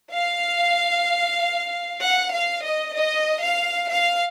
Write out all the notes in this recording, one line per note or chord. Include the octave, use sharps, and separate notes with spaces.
F5
F#5
F5
D#5
D#5
F5
F5